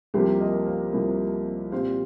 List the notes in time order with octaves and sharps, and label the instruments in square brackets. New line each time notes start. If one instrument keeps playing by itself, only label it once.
[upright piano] C2 C3 F3 A#3 G4 C5
A#4 D#5
C5 F5
C2 C3 F3 A#3
A#2 G3 C4 C5 F5